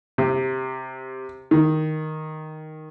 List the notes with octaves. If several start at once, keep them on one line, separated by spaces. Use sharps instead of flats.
C3
D#3